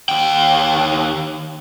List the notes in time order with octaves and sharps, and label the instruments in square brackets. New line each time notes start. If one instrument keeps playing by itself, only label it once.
[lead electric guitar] D#2 G5